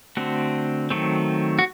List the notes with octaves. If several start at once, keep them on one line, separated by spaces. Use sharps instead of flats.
D3 A3 C4 F#4
D#3 F#3 A3 C4
F#4